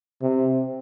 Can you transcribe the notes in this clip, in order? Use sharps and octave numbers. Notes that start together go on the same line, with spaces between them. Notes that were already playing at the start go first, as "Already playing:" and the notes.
C3